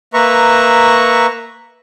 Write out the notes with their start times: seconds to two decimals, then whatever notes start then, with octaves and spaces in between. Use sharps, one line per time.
0.14 A#3 B4 E5 A#5 C#6